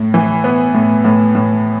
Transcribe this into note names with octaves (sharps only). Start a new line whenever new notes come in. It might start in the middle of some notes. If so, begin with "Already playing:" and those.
Already playing: A2
E3
B3
A2
A2
A2